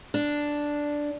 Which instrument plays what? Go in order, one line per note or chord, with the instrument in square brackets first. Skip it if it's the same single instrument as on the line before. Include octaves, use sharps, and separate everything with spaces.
[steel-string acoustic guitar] D4